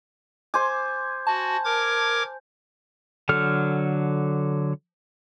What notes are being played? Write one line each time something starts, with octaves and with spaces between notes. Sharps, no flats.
C5 G#5 D6
F#4 A5
A#4 D6 G#6
D3 F#3 A4 F6